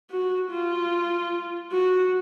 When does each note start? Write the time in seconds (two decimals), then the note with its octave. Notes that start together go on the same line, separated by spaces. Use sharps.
0.11 F#4
0.51 F4
1.72 F#4